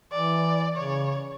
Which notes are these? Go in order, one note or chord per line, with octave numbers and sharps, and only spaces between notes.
E3 D5
C#3 C#5